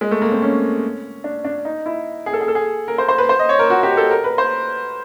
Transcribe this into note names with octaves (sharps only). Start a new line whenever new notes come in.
G#3
A3
A#3
C4
C#4
D4
D4
D#4
E4
G#4
A4
G#4
A4
G#4
A#4
C5
C5
B4
C5
D#5
C#5
A#4
F#4
G4
A4
A#4
B4
C5